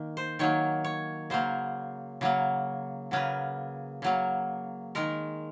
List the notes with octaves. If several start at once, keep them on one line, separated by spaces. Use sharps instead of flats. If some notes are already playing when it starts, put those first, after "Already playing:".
Already playing: D#3 A#3
C5
D#3 F#3 A#3 C#5
C#5
C#3 F#3 A#3 C5
C#3 F#3 A#3
C#3 F#3 A#3 B4
C#3 F#3 A#3
D#3 G#3 A#4